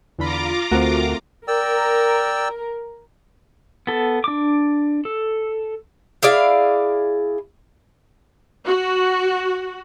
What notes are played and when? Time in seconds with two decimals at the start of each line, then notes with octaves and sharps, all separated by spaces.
0.19 E2 D3 F4 A#5 B5 D6
0.72 D2 A3 C4 F#4 A#4
1.48 A#4 D5 G5 E6
3.87 B3 A4
4.24 D4 D6
5.05 A4
6.23 E4 G#4 D5 F5
8.65 F#4